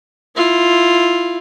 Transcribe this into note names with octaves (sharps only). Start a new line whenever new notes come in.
E4 F4